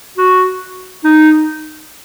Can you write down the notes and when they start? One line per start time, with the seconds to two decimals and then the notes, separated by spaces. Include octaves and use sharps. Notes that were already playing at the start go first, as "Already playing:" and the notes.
0.18 F#4
1.05 D#4